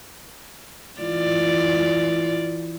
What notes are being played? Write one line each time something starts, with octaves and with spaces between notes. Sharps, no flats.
E3 F4 D5